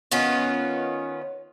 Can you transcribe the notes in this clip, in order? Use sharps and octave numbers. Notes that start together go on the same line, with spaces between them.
D#3 B3 C#4 F4